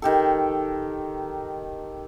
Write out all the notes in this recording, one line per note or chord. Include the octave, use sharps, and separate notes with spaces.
D#3 G4 A4